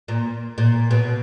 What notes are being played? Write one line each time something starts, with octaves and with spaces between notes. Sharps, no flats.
A#2
A#2
B2